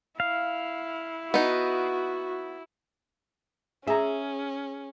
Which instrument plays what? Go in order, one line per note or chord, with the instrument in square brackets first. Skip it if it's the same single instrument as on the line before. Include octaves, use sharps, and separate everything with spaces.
[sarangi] E4 [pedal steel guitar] F5
[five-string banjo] B3 D#4 [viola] F#4
[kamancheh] C#4 [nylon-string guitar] G#4 [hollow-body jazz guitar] E5 A#5